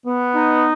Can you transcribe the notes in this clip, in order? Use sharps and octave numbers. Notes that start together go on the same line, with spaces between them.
B3
D#4